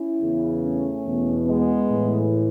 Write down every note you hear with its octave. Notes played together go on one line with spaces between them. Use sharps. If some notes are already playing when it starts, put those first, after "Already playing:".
Already playing: C#4 E4
E2 C#3 E3
A3 C#4
E2 B2
G#3 B3
A2 E3